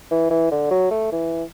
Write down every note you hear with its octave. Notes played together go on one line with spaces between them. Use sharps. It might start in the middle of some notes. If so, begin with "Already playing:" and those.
E3
E3
D3
F#3
A3
E3